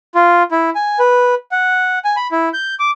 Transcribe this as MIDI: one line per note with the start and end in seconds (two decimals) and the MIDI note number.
0.15 0.43 65
0.52 0.70 64
0.75 0.99 80
0.99 1.35 71
1.51 1.99 78
2.05 2.15 80
2.16 2.27 83
2.32 2.49 64
2.53 2.74 91
2.79 2.91 86